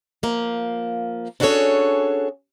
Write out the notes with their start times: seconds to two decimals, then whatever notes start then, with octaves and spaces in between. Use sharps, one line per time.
0.23 F3 A#3
1.40 C#4 D4 F#4 G#4 A4 C#5